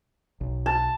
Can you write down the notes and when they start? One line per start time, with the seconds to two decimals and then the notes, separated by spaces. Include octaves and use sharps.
0.41 B1
0.66 A5